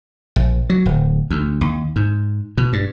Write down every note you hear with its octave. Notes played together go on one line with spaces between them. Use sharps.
A#1
F#3
D1
D2
D#2
G#2
B2
G2